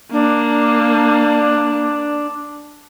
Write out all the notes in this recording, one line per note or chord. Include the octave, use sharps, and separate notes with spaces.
A#3 D4